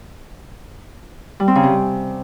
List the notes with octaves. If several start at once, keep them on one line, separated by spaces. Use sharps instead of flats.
G3
C4
C#3
C3